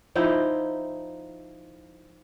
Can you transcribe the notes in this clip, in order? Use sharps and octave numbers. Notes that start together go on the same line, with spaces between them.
F3 D#4 E4 G5